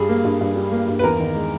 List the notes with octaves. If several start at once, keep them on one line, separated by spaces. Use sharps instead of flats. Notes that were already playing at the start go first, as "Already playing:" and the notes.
Already playing: G2 G3 G#4
A#3
G2
G2
G3
A#3
G2
B4
E2 A#4
D#3
G#3